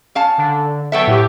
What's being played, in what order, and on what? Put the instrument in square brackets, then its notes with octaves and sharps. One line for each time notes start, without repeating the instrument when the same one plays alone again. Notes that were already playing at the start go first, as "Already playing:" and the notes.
[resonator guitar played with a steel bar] C#4 F5 A5
[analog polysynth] D3
[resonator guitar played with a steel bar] F#3 B3 E5 [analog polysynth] A4 G5
[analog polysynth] A2 G4